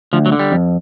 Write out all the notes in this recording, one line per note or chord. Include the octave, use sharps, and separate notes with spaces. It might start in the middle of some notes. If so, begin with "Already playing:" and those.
D2 F3
F#3
D3
G3
F2